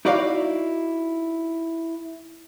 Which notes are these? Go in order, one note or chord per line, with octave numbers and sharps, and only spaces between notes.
D#4 E4 F#4 D5 D#5 F5